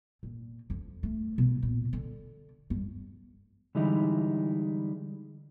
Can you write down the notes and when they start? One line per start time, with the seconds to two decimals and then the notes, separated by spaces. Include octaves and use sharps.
0.23 A#2
0.70 F2
1.03 A3
1.38 B2
1.63 A#2
1.93 D3
2.70 G2
3.75 D3 E3 G3 G#3 D#4 E4